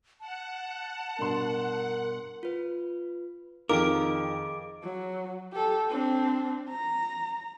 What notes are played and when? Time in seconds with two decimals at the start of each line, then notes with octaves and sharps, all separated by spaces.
0.20 F#5 A5
1.19 G2 B2 A#4 C6
2.43 F4 B4
3.69 F2 D#3 G#4 A#4 D#5 F5 D6 D7
4.83 F#3
5.52 G4 A4
5.89 C4 D4
6.69 A#5